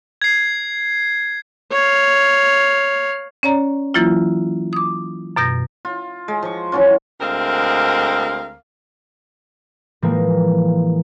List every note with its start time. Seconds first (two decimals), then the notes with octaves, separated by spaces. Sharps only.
0.22 G#6 C7
1.72 C#5 F5
3.43 C#4 C#5 D5 A#5
3.94 E3 F#3 A#3 E4 F4
4.73 D6 D#6
5.36 F#2 B2 G6 A#6
5.85 F4
6.28 G#3
6.42 F3 C#6
6.72 E3 F#3 C#4 F4
7.19 D2 G#3 C4 A#4 F5
10.02 A2 E3 F3 G#3 A#3